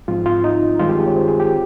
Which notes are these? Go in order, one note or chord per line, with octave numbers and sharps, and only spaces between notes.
G#2 F3 C4 F4
F4
D#4
G2 D#3 G#3 C4 F4
G4
G#4
C#5
C5
G#4
G4